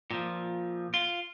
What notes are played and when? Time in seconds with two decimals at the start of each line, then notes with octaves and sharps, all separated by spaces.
0.11 A#2 F3
0.94 F4